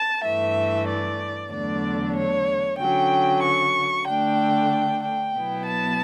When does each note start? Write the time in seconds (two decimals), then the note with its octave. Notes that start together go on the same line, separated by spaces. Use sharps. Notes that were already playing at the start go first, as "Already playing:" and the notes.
Already playing: A5
0.24 G2 E3 A3 E5
0.88 D5
1.51 E2 D3 F#3 A3 D4 D5
2.15 C#5
2.79 D3 F#3 C#4 G5
3.43 C#6
4.07 D3 A3 D4 G5
5.03 G5
5.34 B2 F#3 B3 E4
5.66 A5